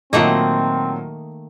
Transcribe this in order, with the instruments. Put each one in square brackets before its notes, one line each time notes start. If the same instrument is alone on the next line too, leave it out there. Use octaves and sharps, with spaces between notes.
[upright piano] A#2 F#3 [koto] D#3 A3 A#3 [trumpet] C4 [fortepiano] D#5